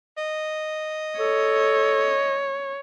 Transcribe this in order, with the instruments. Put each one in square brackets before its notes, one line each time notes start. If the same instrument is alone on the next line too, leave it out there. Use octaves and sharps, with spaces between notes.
[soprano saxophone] D#5
[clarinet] A4 [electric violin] C#5